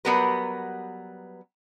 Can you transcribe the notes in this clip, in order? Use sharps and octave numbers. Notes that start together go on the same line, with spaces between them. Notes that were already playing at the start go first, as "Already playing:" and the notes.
F#3 G3 B3 G4 A#4 B4